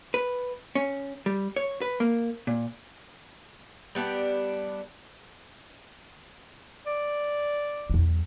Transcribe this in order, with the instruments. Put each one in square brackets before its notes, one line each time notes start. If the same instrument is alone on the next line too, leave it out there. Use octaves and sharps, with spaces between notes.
[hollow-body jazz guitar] B4
C#4
G3
C#5
B4
A#3
A#2
[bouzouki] G3 B3 D4 G4
[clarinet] D5
[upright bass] E2 F#3